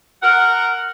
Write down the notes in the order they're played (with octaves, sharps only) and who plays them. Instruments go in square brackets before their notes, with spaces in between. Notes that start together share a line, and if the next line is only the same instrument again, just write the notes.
[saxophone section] A#4 F#5